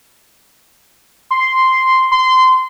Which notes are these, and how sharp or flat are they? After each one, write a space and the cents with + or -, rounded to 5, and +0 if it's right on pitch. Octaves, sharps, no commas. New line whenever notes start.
C6 -5
C6 -20